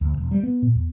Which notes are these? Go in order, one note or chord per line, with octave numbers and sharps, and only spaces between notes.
D2
E1
G3
B3
A#2
E2